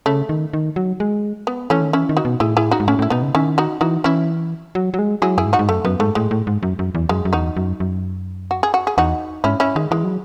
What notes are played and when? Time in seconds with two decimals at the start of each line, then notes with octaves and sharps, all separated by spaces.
0.06 C#3 A3
0.29 D#3
0.53 D#3
0.76 F#3
1.00 G#3
1.47 B3
1.70 E3 A3 C#4
1.82 D#3
1.93 E3 C#4 E4
2.09 D#3
2.17 D#4 F#4
2.25 B2
2.40 A2 E4 G#4
2.57 E4 G#4
2.71 D#4 F#4
2.80 G#2
2.88 A2 C#4 E4
2.99 A2
3.02 E4
3.10 B2 B3 D#4
3.23 C#3
3.35 D#3 C#4 E4
3.58 D#4 F#4
3.81 E3 D#4 F#4
4.04 E3 C#4 E4
4.75 F#3
4.94 F#3
4.99 G#3
5.22 F#3 E4 G#4
5.38 F#2 E4 G#4
5.46 G#2
5.53 D#4 F#4
5.59 G#2
5.69 F#2 A3
5.85 F#2 B3
6.00 G#2 A3
6.15 A2 G#3
6.31 A2
6.47 G#2
6.63 F#2
6.79 F#2
6.95 E2
7.09 F#2 G#3
7.25 F#2
7.33 E2 D#4 F#4
7.57 F#2
7.80 F#2
8.51 F#4
8.63 G#4
8.74 F#4
8.87 G#4
8.98 E2 D#4 F#4
9.44 G#2 C#4 E4
9.60 C#4 E4
9.76 D#3 G#3
9.91 E3 G#3
10.04 F#3